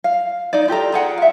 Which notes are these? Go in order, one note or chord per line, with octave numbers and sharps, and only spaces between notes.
F5
D#4 D5
F4 G4 A4 A#5
G#4 D5 F#5 G5
E5 F5